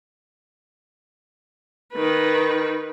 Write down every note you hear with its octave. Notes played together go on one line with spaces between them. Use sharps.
D#3 B4